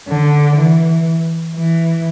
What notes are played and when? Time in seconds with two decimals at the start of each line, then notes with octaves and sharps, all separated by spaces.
0.09 D3
0.57 E3
1.56 E3